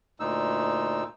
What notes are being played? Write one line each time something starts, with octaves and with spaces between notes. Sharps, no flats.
D2 A#2 D#4 E6